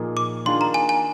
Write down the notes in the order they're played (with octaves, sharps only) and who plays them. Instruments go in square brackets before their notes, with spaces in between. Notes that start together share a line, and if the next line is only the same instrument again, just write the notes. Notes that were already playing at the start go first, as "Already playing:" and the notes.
Already playing: [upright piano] A#2 F3 A#3 D#4 G#4
[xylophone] D6
[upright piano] D#3 A#3 D4 F4 G#4 [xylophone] C6
[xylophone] A#5
G#5
G#5